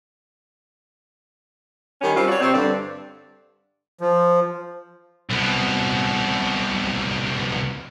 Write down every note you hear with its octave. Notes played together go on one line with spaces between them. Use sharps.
D#3 G3 C#4
G3 C4 F4
F#4 C#5 D5
C3 C4
G2 D3 D5
F3
C2 B2